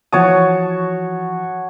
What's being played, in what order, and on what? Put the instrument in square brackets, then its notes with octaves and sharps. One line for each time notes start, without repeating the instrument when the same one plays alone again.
[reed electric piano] E3 F3 D#6 [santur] F#4 C#5 A5